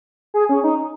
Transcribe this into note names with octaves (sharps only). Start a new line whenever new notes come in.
G#4
C#4
D#4